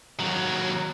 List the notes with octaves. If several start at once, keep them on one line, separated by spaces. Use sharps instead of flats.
D#2 F#3